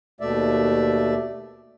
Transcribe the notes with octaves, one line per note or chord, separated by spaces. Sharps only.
D#2 B2 A3 D5 E5